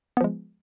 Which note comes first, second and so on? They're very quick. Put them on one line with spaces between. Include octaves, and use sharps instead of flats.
B3 F3 G#3